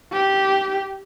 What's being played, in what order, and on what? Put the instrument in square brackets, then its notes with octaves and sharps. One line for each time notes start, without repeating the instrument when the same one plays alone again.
[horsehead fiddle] G4